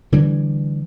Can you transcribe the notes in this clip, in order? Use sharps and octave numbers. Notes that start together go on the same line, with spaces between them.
D3 E3 G3